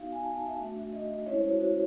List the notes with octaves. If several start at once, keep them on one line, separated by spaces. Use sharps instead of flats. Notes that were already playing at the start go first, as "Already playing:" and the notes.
Already playing: B3 D#4 F#4 F5
G#5
A5
G#5
E5
A3 D4 F#4
D#5
G#3 C#4 E4 C#5
C5
F#4
F#4